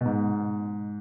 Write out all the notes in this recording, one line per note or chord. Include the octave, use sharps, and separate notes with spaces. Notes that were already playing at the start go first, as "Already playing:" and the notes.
B2
G#2